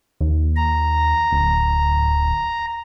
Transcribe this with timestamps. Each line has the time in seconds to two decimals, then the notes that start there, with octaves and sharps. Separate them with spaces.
0.21 D#2
0.56 A#5
1.32 D1